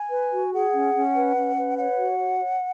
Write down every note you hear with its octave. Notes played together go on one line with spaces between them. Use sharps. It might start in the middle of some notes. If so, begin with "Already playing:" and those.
Already playing: G#5
B4
F#4
G#4 F#5
C#4
C#4
B4
C#4
B4
C#5 F#5
F#4
C#5
C#5